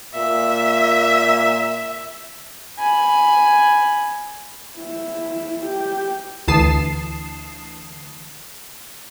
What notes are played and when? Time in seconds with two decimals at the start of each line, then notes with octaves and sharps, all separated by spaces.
0.14 A#2 E5
2.79 G#5 B5
4.79 E4
5.66 G4
6.48 D2 E3 A5 D#6 C7 E7